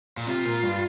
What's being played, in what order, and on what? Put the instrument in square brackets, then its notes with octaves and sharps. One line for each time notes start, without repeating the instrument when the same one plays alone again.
[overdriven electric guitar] A#2
[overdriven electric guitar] C3 [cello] F4
[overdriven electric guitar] A#2
G2